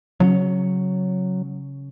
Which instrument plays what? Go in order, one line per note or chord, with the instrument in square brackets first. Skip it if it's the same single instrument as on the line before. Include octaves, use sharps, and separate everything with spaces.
[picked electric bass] C#3 C4 C#4 [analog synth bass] F#3